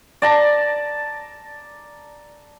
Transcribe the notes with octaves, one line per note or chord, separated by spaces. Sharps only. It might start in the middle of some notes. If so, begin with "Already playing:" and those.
D5 A5 A#5